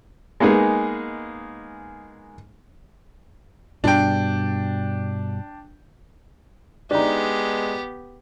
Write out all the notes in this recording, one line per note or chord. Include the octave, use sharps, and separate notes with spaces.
G#3 A#3 B3 D#4 G#4
G2 B2 D4 G5
G#3 B3 D4 D#4 G4